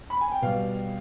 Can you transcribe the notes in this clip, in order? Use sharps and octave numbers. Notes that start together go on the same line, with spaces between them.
B5
G#5
G5
B2 G3 F5